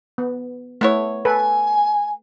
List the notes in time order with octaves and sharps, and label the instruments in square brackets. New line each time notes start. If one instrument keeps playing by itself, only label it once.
[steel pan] B3
[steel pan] A3 [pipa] B3 E4 C#5
[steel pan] A4 B4 [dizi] G#5